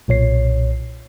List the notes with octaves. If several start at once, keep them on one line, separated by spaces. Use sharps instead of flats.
B1 A#2 C#5 C7